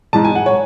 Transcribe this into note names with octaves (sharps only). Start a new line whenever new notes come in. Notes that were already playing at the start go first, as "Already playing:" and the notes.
G#2 E3 G#3 A5
G#5
F#5
C#5